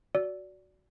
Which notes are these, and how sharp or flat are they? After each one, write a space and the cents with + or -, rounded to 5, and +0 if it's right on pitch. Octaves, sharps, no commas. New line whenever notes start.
F#4 +0 D5 -20 E6 +0